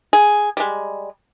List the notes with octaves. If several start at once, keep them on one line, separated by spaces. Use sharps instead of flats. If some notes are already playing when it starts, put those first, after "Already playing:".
G#4
G3 G#3